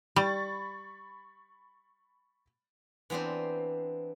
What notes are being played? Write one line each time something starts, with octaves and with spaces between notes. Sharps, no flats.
G3 B5 C#6 A6
E3 B3 C4 D4 C5